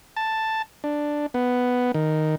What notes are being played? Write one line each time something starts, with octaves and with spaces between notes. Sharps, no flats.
A5
D4
B3
D#3